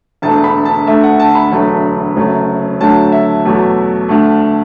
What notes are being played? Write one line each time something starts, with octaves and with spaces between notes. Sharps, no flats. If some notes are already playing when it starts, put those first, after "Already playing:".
E1 D2 D3 A3 A5
B5
A5
D2 D3 A3 E5
F#5
A5
B5
E1 D2 D3 F#3 A3
F#1 F#2 F#3 A3
D2 D3 F#3 A3 A5
E5
E2 B2 F#3 A3
D2 D3 A3